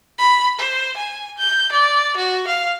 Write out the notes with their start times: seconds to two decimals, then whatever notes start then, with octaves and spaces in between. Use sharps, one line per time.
0.19 B5
0.59 C5
0.97 G#5
1.38 G6
1.72 D5
2.17 F#4
2.47 F5